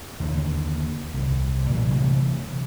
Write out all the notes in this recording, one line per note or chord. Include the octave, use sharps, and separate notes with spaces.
D#2 D3 E3
C2
A#2 E3 F#3
C3 E3 A3 C4